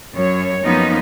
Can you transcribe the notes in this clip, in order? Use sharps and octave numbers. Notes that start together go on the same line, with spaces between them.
F#2 C#5
F#2 F3 A#3 B3 C#4 D#4